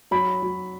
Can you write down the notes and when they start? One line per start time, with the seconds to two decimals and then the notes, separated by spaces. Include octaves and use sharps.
0.11 F#3 B5
0.43 F#3